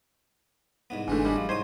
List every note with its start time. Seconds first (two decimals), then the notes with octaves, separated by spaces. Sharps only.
0.90 C2 G#2 B3
1.08 G1 E3 G#3 A3 D4
1.25 A2 G3 G#3
1.37 F3
1.49 C2 G#2 C5 C#5 D#6 G#6